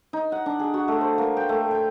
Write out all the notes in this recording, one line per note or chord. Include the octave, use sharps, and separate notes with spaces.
D#4
F#5
D4
G#4
F#4
A3
C5
A#3
G5
A3
G5